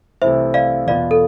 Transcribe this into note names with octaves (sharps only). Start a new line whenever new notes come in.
C2 C3 E3 A3 E4 C5 E5
D5 F5
E2 B2 B3 F4 D5 F5
A4